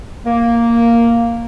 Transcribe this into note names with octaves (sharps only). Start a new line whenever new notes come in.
A#3